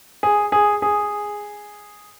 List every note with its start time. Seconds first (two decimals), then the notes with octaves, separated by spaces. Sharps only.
0.23 G#4
0.52 G#4
0.82 G#4